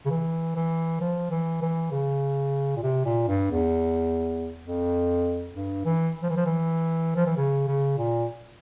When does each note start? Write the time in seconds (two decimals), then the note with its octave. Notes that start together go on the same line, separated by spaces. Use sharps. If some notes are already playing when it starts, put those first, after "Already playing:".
0.05 C#3
0.10 E3
0.56 E3
1.01 F3
1.31 E3
1.62 E3
1.92 C#3
2.76 A#2
2.83 C3
3.05 A#2
3.28 G2
3.51 E2
4.64 F2
5.55 G2
5.85 E3
6.23 F3
6.30 E3
6.37 F3
6.46 E3
7.16 F3
7.26 E3
7.37 C#3
7.67 C#3
7.98 A#2